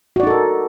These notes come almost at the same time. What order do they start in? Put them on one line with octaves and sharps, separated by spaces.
F#4 D5 D#4 A4 A#4